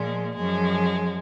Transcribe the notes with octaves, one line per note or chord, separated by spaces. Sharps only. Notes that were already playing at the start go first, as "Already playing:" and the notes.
Already playing: A#2 F3 G#3
F#2 F3 G#3